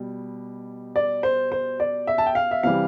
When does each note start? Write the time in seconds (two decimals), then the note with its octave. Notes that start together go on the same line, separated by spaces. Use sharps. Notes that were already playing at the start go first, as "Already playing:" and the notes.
Already playing: B2 G3
0.96 D5
1.23 C5
1.52 C5
1.80 D5
2.07 E5
2.18 A5
2.26 G5
2.35 F5
2.51 E5
2.63 C3 E3 G3 F5